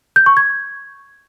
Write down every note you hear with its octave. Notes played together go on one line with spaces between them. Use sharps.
G6
C#6
G#6